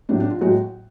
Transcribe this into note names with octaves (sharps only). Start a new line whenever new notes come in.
A2 F#3 D4
D4
F4
A2 F#3 G#3 F#4